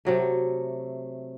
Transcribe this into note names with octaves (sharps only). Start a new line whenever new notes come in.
C3 F#3 A3